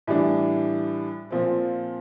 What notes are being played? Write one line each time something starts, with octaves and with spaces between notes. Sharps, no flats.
A2 E3 G3 D4
A#2 F3 C4